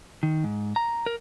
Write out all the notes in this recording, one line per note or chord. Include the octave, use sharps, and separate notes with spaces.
D#3
G#2
A#5
A#4